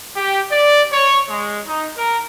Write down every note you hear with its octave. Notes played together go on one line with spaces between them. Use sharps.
G4
D5
C#5
G#3
D#4
A#4